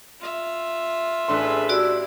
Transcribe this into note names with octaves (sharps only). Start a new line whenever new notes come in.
F4 E5
A1 D4 G#4 A4 B4 C6
E4 F#4 G4 D5 E6